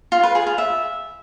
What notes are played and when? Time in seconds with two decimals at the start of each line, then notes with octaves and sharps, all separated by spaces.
0.12 F4
0.23 B4
0.35 G#4
0.47 F4
0.58 E5